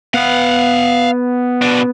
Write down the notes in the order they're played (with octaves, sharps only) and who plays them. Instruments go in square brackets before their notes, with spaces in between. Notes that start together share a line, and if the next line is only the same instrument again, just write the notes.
[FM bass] B3 [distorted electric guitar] F5 F#5
[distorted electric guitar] B2 D4